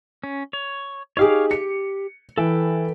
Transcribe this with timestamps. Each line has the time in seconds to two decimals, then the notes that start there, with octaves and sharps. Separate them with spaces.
0.24 C#4
0.53 C#5
1.17 D#4 G4 G#4 C#5 F5 D6
1.51 G4 C#7
2.38 E3 A4 B4 G5